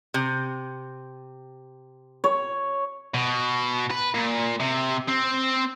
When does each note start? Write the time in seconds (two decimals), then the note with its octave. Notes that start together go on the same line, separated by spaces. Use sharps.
0.14 C3
2.24 C#5
3.14 B2
3.91 B4
4.14 A#2
4.60 C3
5.09 C4